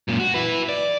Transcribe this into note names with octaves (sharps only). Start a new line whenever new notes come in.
F#2 A#2
F#4
E4 B4
D5